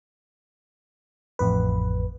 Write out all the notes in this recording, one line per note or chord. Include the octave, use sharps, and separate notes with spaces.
A1 F2 B4